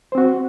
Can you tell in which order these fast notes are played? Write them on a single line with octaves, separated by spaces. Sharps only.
C5 C4 F#4